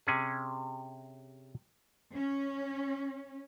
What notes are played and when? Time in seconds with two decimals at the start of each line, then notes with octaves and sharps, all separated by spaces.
0.07 C3 C#4 G#4
2.14 C#4